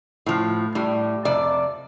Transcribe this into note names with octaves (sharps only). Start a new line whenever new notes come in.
A2 F3
A2 G3
F2 C3 D5